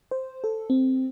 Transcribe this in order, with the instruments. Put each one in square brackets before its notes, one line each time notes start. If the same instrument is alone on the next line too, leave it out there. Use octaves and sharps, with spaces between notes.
[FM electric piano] C5
A4
C4